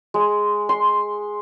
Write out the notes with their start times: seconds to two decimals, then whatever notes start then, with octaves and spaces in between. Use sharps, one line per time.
0.14 G#3
0.69 C6